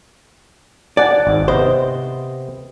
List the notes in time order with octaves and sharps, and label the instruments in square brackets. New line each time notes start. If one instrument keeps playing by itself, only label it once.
[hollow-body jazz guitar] D5 [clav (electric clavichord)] F#5 G#5 A5
[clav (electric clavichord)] G#1 G#2
[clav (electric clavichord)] C3 B3 D#5 [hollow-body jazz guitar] C5